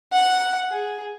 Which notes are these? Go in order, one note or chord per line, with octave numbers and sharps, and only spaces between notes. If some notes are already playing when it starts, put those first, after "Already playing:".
F#5
G#4